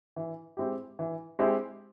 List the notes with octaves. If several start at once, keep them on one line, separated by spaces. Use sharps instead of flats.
E3
G#3 C4 E4 G4
E3
G#3 C4 E4 G4